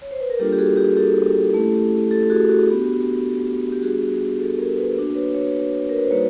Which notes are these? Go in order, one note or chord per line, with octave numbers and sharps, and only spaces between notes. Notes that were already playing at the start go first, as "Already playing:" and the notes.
C#5
C5
B4
A#4
G3 A#3 D4 F4 G4 A4
G4
F#4 G#4
G4
G4 A4
A3 C#4 E4
G4 A4
A4
F#4 G#4
F#4
B3 D4 F#4 G4
G4
G3 B3 D4 F#4 G#4
G4 A4
G#4 A#4
A4 B4
A#3 D4 F#4
B4 C#5
B4 C#5
A#4
B4
C5
G3 A#3 D#4 F#4 B4 C#5